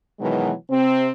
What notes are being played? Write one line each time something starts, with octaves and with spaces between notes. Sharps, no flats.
B2 D#3 E3 F#3 G#3
C3 C4